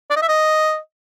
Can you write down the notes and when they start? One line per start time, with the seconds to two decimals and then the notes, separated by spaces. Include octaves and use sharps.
0.10 D5
0.16 D#5
0.22 E5
0.28 D#5